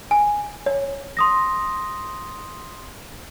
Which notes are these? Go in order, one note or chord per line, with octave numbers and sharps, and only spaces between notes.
G#5
C#5
C6 D#6 A#6